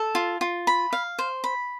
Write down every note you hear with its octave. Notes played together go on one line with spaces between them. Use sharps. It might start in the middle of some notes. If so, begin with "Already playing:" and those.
Already playing: A4
F4
F4
B5
F5
C5
B5